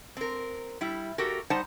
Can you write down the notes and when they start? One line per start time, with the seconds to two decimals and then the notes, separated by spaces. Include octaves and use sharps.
0.17 C4 A#4
0.81 G3 E4
1.18 F#4 G4 A4 A#4
1.50 G3 D#4 C5 F#5 A5